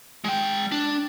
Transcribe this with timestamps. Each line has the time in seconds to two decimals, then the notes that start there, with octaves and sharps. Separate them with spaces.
0.24 G#3 G5
0.72 D4